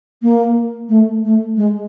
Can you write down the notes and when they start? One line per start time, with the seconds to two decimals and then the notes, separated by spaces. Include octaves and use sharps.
0.22 A#3
0.89 A3
1.24 A3
1.57 G#3